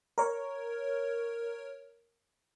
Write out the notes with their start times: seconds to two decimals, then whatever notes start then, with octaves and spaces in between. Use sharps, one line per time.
0.18 A#4 C#5